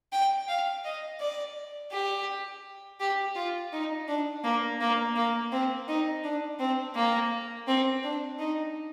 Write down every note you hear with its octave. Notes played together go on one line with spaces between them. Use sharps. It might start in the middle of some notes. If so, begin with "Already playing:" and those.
G5
F5
D#5
D5
G4
G4
F4
D#4
D4
A#3
A#3
A#3
C4
D#4
D4
C4
A#3
C4
D4
D#4